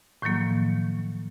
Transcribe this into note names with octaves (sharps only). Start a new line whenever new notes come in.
A2 D#3 F3 F#3 A#3